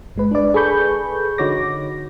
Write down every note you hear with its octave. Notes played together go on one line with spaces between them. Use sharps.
G1 G#3 B4
D4 D5
G#4 A4 B4 B5 C#6 G6
D3 D#4 F#4 C#5 D6 A#6